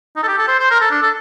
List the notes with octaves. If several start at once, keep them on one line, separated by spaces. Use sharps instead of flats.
D#4
A4
G4
A4
C5
C5
A#4
A4
D4
A4